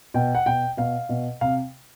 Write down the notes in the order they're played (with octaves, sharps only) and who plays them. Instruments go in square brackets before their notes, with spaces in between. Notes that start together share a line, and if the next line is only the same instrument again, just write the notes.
[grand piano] B2 G5
F#5
B2 G5
B2 F5
B2
C3 F5